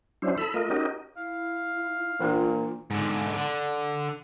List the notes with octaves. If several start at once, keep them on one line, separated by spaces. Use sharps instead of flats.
F#3 C#4 D4 E4 C5
A4 B5 E6
A3 F4 A#4 D#5
C#4 D#4 F#4 G4 A#4 D#5
E4 F5
A#2 E3 A#3 D4 F4
G#2 D3
D3